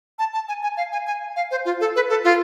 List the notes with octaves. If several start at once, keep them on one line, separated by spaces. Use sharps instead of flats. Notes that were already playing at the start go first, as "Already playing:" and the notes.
A5
A5
G#5
G#5
F5
G#5
G#5
F5
C5
F4
A4
B4
A4
F4